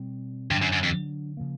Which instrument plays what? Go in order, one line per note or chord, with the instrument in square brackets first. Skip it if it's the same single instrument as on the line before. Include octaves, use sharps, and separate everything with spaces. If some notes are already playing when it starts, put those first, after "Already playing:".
Already playing: [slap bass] B2 G3 C4
[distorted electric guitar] G2 [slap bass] D3 F#3 B3 D4
[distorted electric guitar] F#2
F#2
F2
[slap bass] C#3 F3 A#3